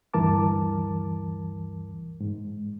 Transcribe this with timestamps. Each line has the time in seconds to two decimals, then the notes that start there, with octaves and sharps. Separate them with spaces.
0.14 D2 G2 E3 A#4 A5 D6
2.20 G#2